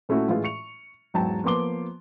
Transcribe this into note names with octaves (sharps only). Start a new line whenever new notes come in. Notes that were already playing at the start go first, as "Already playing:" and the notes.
A#2 A3 C#4 E4 F#4
A2 E3 G#3 F4
C#6 C#7 F7
E2 G#2 F#3 G5 A5
F3 A#3 B3 C6 D6 G7